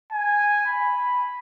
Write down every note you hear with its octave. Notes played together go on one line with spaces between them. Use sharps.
G#5
B5